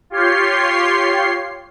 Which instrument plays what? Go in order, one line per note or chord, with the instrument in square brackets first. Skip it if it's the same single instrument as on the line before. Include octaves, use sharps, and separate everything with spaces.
[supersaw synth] F4 G4 C#5 C6 C7